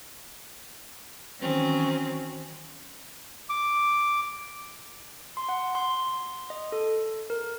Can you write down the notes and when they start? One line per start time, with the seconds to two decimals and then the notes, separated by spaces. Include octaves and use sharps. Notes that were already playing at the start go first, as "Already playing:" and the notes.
1.40 D#3 E3 F#3 C4 C#4
3.50 D6
5.37 C6
5.49 F#5
5.75 C6
6.50 D#5
6.72 A4
7.30 A#4